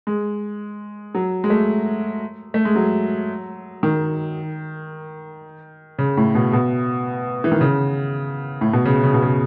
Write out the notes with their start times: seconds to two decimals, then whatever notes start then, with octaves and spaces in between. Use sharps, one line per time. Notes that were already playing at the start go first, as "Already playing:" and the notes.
0.07 G#3
1.15 F#3
1.44 G#3
1.50 A3
2.54 A3
2.65 G#3
2.75 F#3
3.83 D#3
5.99 C#3
6.17 A2
6.35 B2
6.53 B2
7.44 E3
7.52 D#3
7.61 C#3
8.61 A2
8.73 B2
8.85 C#3
9.04 C#3
9.14 B2
9.22 C#3